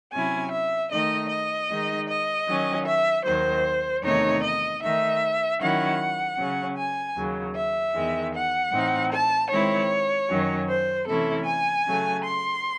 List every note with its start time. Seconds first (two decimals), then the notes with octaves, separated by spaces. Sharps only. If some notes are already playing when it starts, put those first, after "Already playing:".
0.12 C3 F#3 C#4 E4 G#5
0.51 E5
0.91 D#3 A3 D#4 D#5
1.29 D#5
1.69 D#3 G#3 D#4
2.08 D#5
2.48 D#3 F#3 C#4
2.86 E5
3.25 D#2 D#3 F#3 C5
4.03 E2 C3 D#3 A3 D#4 C#5
4.43 D#5
4.81 D#3 A3 D#4 E5
5.60 D#3 F#3 C#4 E4 F#5
6.38 C#3 F#3 C#4
6.77 G#5
7.16 D#2 C#3 F#3
7.55 E5
7.95 E2 D#3 G#3
8.34 F#5
8.72 A2 E3 C4 D#4
9.11 A5
9.50 D#3 G#3 C4 E4 C#5
10.30 F#2 D#3 F#3 C#4
10.68 C5
11.07 C3 E3 A3 C#4 E4 A4
11.46 G#5
11.86 C#3 F#3 A3
12.24 C6